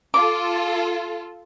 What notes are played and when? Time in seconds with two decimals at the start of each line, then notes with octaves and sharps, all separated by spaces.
0.14 F4 A4 D6